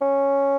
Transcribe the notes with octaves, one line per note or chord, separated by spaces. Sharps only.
C#4